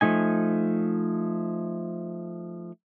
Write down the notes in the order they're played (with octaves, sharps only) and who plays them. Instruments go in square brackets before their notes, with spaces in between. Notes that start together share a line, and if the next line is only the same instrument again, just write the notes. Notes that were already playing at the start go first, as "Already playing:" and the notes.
[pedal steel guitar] F3 A3 D#4 G#5